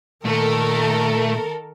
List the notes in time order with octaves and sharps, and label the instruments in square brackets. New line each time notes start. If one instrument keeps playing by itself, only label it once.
[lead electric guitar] A#2 [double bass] D#3 [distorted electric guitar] A3 [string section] A4 A#4